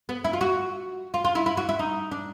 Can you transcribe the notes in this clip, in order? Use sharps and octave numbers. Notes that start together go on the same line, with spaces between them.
B3
E4
F4
F#4
F4
F4
E4
E4
F#4
E4
D#4
D4